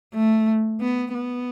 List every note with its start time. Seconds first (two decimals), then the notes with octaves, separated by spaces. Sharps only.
0.14 A3
0.81 B3
1.14 B3